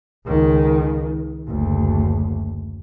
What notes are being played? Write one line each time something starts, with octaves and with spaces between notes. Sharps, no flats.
C#2 D#3
F#1 D2